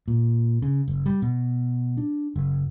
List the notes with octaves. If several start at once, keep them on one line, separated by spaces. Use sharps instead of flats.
A#2
C#3
F#1
G3
B2
D4
F#1